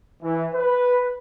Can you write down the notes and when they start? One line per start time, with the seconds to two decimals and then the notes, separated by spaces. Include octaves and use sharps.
0.22 E3
0.54 B4